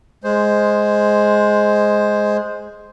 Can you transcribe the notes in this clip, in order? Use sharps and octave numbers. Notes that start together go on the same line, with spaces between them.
G#3 C5